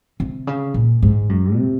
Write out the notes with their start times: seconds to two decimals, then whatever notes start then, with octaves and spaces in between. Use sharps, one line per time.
0.20 C3
0.47 C#3
0.74 A#2
1.02 G#2
1.29 F#2
1.56 C3